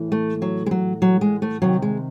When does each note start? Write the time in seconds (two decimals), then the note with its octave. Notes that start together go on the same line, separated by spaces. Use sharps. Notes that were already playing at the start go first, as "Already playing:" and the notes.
Already playing: A2 E3
0.12 A3
0.42 F#3
0.66 G#3
0.71 F#3
1.02 F#3
1.21 G#3
1.42 A3
1.62 C3 D#3 F#3
1.82 G#3